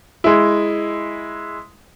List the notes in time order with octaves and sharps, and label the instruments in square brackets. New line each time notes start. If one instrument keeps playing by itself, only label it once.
[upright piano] G#3 E4